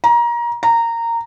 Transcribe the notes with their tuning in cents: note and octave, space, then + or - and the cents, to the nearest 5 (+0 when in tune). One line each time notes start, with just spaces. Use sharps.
A#5 +25
A#5 -15